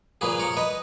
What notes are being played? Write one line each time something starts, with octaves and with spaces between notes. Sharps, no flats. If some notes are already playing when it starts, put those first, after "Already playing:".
A#2 F3 A#3 G#4 B4
A#4 C#5
B4 D#5